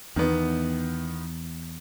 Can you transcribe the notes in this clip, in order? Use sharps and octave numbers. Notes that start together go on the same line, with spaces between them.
E2 D#3 B3